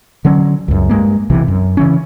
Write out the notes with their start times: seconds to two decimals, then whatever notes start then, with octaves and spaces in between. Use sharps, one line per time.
0.25 D3 F#3 C#4
0.68 C#2 F#2
0.89 G2 G#3 A#3
1.30 B1 C3 E3
1.48 F#2
1.77 C#3 E3 C#4